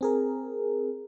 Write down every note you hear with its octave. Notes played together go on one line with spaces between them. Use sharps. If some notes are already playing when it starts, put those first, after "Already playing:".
C4 G#4 A#4